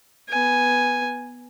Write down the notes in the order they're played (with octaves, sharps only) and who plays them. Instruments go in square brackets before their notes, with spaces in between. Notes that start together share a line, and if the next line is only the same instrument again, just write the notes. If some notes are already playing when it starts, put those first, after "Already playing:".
[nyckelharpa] B3 G#5